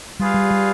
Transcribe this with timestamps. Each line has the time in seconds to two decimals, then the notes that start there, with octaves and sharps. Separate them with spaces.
0.19 G3 F4 G#4 B4 F5
0.34 G3
0.51 G3